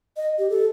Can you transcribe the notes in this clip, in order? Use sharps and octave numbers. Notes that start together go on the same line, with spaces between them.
D#5
G4
A4